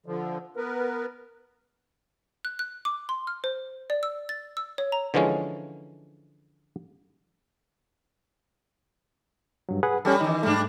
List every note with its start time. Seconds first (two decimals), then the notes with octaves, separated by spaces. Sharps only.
0.06 D3 F3
0.57 B3 A#4 B4
2.45 F#6
2.59 F#6
2.85 D6
3.09 C6
3.27 F6
3.44 C5
3.90 D5
4.03 E6
4.29 A6
4.57 E6
4.78 C#5
4.92 A#5
5.14 D3 E3 F3 G#3 C#4
9.69 G2 F#3
9.83 G#4 B4 F#5
10.05 G3 C#4 G4 A4
10.21 D#3 E3 D#4
10.43 G#2 G3 A3 D4